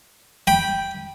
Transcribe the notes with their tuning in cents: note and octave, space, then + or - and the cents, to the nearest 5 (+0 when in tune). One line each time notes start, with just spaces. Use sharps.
G5 +0 B5 -15